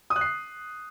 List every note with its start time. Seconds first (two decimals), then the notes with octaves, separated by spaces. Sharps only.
0.10 D#6
0.16 F#6
0.21 C7